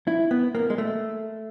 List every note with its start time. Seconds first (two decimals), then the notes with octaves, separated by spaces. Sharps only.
0.07 E4
0.31 B3
0.55 A#3
0.70 G#3
0.78 A3